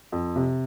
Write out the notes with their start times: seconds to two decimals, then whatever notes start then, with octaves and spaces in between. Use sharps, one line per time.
0.12 F2
0.36 C3